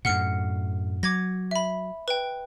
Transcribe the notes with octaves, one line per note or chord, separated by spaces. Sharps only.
F#2 A2 F#5 F6 C#7
F#3 D6 G#6 A#6
E5 B5
B4 G5